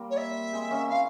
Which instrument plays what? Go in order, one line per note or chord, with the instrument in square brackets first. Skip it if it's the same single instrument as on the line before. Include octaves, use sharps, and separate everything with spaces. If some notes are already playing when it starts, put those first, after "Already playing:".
Already playing: [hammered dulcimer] G3 A#3 C4
[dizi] C#5
E5
[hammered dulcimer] G#3 C4
A#3 C#4
[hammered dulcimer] C4 E4 [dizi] F5